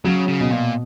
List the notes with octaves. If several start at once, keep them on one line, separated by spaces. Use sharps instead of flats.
C#3 F#3
C#3
B2
A#2